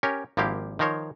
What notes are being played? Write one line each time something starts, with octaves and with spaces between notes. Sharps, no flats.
C#4 G4 A#4 C#5
G#1 F3 A#3 E4 G4 F5
D#3 F3 A#4 C5 C#5